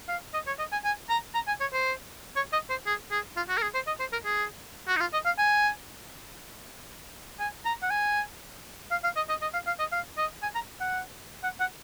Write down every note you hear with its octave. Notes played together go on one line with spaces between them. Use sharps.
F5
D#5
C#5
D#5
G#5
G#5
A#5
A#5
G#5
C#5
C5
C#5
D#5
C5
G#4
G#4
F4
F#4
A#4
G#4
C5
D#5
C5
A#4
G#4
F#4
D#4
F4
D#5
F5
G#5
G#5
A#5
F#5
G#5
F5
F5
D#5
D#5
D#5
F5
F5
D#5
F5
D#5
G#5
A#5
F#5
F#5
F#5